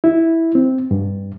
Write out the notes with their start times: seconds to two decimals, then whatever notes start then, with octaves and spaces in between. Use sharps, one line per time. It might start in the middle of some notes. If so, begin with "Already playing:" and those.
0.04 E4
0.55 C4
0.91 G2